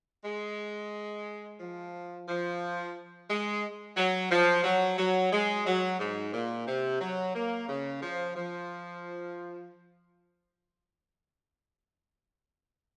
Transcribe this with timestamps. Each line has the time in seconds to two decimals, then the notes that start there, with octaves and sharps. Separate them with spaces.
0.25 G#3
1.60 F3
2.29 F3
3.29 G#3
3.97 F#3
4.31 F3
4.64 F#3
4.98 F#3
5.33 G#3
5.67 F#3
6.00 G#2
6.33 A#2
6.67 C3
7.01 F#3
7.35 A#3
7.68 C#3
8.03 F3
8.36 F3